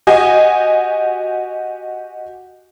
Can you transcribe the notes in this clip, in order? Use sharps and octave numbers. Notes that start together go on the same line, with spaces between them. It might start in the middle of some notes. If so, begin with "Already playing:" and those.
F#4 G4 D#5 G#5